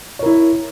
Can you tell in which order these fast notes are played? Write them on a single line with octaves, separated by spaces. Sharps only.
C#5 A#4 E4